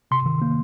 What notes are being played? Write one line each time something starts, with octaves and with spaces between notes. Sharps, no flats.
C3 C6
D#3
A#3